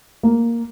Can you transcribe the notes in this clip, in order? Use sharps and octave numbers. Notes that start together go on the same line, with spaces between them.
A#3